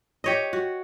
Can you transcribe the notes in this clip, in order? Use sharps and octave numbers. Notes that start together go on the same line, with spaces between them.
G4 C#5 D#5
F#4